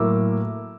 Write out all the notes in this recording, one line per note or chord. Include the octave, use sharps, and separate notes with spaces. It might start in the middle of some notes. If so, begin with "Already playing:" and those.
Already playing: A2 F#3 A#3 D6 E6